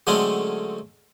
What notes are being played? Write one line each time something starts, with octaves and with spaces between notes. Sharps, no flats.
D3 F#3 G#3 A3 C4 C#4